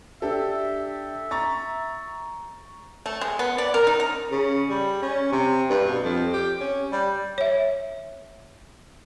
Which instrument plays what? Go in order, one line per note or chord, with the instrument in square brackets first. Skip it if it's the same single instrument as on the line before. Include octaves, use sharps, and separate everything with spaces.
[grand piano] D4 G4 A4 [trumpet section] E5
[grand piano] A#5 C#6 A6
[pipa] A3
G#3
B3
D5
A#4
D#4
A#5
[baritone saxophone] C#3
G3
C#4
C3
G2
B2
F2
G4
C#4
G3
[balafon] C#5 E5